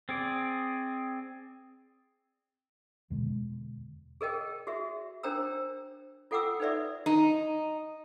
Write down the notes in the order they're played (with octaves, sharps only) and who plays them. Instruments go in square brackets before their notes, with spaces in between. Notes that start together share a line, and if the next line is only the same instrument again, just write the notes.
[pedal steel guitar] C4 G#4 D5
[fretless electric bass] E2 B2 D3 G#3
[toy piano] G#4 A#4 D#5 G5
F#4 G#4 E5
D4 A#4 C5 G5 A#5 E6
F4 A4 F#5 G5 D6 E6
D#4 A4 B4 D5 E5
[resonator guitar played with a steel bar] D#4